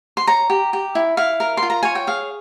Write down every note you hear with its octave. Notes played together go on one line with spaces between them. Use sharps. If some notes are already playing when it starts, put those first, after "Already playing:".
C6
C#5 A#5
G4
G4
E4
E4 F5
A#4
C6
F4
A#5
C#5 G#5
G5
G#4 F5